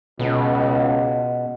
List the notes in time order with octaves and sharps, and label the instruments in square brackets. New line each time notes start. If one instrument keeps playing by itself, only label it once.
[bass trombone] C#2 [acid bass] B2